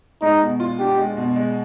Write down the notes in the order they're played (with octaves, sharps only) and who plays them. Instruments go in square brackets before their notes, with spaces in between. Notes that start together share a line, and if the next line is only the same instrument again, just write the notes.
[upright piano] G#3 [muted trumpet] D#4
[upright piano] B2
F4
[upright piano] D4 [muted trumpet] G4
[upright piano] G#3
B2
G#3